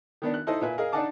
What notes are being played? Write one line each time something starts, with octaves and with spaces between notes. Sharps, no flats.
D#3 B3 D4
F#6
D#4 E4 A4 C5 D#5
A#2 B4 E5 G#5
G#4 A#4 D#5 F5
D4 D#4 D#5 F#5 A5 D6